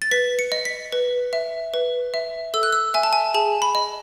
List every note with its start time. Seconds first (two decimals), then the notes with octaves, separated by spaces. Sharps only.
0.02 A6
0.11 B4 B6
0.39 C#7
0.52 D#5
0.65 B6
0.92 B4
1.33 E5
1.74 B4
2.14 E5
2.54 A4 E6
2.63 F#6
2.73 E6
2.94 E5 G#5
3.03 A5
3.13 G#5
3.34 G#4 A5
3.62 B5
3.75 D#5